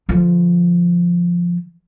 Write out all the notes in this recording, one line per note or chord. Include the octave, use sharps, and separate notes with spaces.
D3 F3